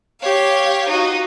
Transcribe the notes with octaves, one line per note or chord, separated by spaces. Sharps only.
G4 C#5 F5
D#4 F4 F#4